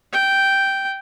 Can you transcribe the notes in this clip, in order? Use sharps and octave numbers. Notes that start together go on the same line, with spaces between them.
G5